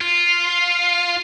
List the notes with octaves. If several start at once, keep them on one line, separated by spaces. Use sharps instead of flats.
F4